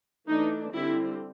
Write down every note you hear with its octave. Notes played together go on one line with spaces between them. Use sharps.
E3 A3 D4 D#4
D3 G3 C4 E4